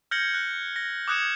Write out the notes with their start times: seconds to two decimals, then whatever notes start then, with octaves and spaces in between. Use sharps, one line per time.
0.11 F6 G6 G#6 A#6 C#7 F#7
0.34 F#6
0.76 A#6
1.08 D6 D#6 F#6 G#6 C#7 E7